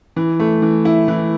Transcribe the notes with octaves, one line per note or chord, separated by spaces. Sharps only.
E3
A3
E3
E4
E3